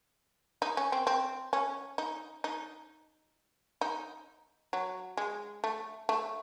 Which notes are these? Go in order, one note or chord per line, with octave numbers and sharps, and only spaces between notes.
D#4
C#4
C4
C4
C#4
D#4
D#4
D#4
F#3
G#3
A3
A3